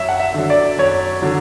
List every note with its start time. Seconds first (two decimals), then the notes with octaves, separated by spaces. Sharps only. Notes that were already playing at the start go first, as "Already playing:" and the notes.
Already playing: F#2 E5
0.09 F#5
0.20 E5
0.34 D3 F#3
0.50 D5
0.78 F#2 C#5
1.22 D3 F#3